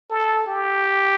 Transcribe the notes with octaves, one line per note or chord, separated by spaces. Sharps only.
A4
G4